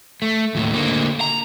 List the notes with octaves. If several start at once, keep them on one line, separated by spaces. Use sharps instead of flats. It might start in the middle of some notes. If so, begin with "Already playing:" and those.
A3
D#2 A2
D3 A#3
A#5